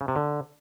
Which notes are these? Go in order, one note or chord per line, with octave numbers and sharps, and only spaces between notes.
C#3
C3
D3